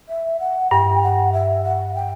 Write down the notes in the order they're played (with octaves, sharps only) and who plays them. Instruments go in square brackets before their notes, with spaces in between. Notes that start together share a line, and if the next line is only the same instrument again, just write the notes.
[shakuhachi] E5
F#5
[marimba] G2 [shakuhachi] G5
[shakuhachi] F#5
E5
F#5
G5